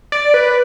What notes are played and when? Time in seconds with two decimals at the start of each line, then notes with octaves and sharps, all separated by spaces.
0.12 D5
0.34 B4